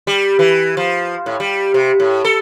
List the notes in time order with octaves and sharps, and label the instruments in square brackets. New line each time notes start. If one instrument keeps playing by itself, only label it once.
[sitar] G3
E3
F3
A2
G3
C3
A2
A4